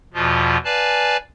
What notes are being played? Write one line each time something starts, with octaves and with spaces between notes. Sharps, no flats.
E2 B2 F3 F4
B4 D5 F5 G#5 A5